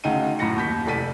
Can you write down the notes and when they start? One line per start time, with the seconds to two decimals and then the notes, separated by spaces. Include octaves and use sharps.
0.04 D2 C#3 D#4 G5 D#7
0.39 F#2 A2 B5 A#6 C#7
0.56 D#2 G6 B6
0.85 F1 A4 D5 B6 D#7